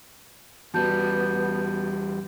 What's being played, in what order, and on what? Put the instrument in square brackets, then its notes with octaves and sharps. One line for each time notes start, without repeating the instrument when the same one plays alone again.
[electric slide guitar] E2 G3 [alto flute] B3 [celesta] F#4 A5 G6